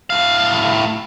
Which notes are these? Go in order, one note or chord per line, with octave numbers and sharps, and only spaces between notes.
A2 F5